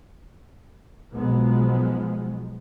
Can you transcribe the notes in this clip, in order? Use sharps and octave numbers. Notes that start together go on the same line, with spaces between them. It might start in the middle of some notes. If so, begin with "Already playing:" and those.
B1 F3 F#3 G#3 B3